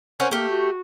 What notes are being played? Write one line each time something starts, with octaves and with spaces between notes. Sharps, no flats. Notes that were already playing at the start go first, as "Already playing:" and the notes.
C#4 A#4 C5 F#5
A3 A#3 G4
F#4